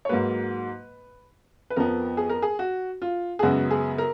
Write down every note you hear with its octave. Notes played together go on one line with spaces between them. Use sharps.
C#5
G#2 F#3 A#3 B4
B4
F2 F3 B3 A#4
G#4
A#4
G#4
F#4
F4
G#4
F#2 C#3 G#3 B3 F#4
G#4
A#4